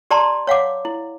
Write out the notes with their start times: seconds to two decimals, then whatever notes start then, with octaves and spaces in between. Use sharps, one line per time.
0.10 G4 D5 A5 A#5 C6
0.47 C#5 F5 F#5 D6
0.85 E4